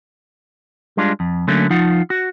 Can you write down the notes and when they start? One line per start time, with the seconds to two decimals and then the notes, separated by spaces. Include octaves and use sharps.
0.97 G3 G#3 D4 F4
1.20 F2
1.48 D3 F#3 A3 A#3 C#4
1.70 F3 D#4 F4 F#5
2.10 F#4